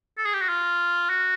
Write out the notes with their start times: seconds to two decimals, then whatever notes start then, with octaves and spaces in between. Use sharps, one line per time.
0.18 A4
0.25 G#4
0.34 G4
0.41 F#4
0.49 F4
1.10 F#4